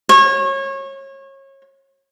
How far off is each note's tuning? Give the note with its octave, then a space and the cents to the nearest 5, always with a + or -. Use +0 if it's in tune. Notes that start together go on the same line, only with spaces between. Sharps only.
C#5 -30